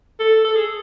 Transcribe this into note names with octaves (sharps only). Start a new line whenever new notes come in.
A4
A4
G#4